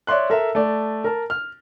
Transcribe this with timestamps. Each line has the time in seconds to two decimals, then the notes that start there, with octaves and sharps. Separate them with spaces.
0.07 C#5 D5 E5 C6 F#6
0.30 A4 A#4 E5
0.55 A3 D5
1.04 A#4 A5
1.30 F6